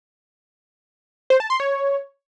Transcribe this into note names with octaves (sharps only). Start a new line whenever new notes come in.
C5
A5
C6
C#5